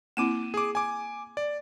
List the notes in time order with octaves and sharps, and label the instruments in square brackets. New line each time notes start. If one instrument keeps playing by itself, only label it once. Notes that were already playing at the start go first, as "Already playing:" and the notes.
[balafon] A#3 C4 E4 [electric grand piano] D6 D#7 E7
[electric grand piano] G#4 D6
G#5 D6
D5